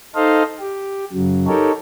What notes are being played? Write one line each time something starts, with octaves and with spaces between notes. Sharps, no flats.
D#4 A4 C5 D#5 F5
G4
F#2 C#3 F#3
D#4 G4 A4 A#4 C#5